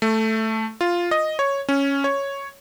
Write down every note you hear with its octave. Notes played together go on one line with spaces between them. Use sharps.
A3
F4
D#5
C#5
C#4
C#5